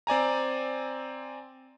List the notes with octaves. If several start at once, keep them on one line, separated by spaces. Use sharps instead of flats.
C4 D5 G#5 A#5